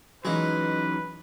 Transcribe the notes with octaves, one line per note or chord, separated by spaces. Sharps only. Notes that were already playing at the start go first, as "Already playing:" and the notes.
E3 F#3 G#3 C#4 D#4 G#4 B4